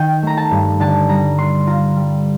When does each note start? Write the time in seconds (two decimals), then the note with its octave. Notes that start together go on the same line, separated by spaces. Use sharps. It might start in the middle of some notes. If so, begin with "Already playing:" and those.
Already playing: D#3 G5
0.23 A3 A#5
0.37 A5
0.51 G2
0.80 D3 A5
1.09 G3 A#5
1.38 D4 C6
1.67 F4 A#5
1.96 G3